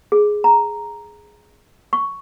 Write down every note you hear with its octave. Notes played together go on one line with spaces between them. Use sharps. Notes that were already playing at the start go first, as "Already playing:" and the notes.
G#4
A#5
C#6